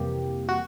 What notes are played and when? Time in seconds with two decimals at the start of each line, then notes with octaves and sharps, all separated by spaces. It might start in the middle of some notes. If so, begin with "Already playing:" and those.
Already playing: F2 C3 E3 G3 A#3 G4
0.49 F#4